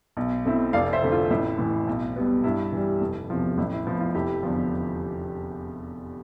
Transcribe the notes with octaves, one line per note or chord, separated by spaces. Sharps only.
B1
B2 A3 C4 E4
F1 D5 F5
C5 E5
F2 D3 A3
F4
A1 E4
A2 E3
B1
B2 G3 B3
G2 E4
E3 G3
F1
E2 C3 F3
A1 E4
E4
A2 F3 B3 E4
F4
F1 E4 G4
E2 D3 F3